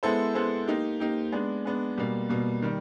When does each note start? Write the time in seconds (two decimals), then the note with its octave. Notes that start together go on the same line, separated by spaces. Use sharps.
0.03 G#3 B3 E4 A4 C5
0.35 G#3 B3 E4 A4 C5
0.67 A#3 D#4 G4
1.00 A#3 D#4 G4
1.32 G#3 B3 D4
1.65 G#3 B3 D4
1.98 B2 G3 A#3
2.29 B2 G3 A#3
2.62 D#3 G3